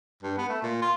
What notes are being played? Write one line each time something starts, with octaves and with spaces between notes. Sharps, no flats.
G2
B3
A3
A#2
F4